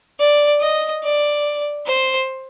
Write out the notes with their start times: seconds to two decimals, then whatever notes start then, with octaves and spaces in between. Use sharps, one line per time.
0.19 D5
0.61 D#5
1.04 D5
1.87 C5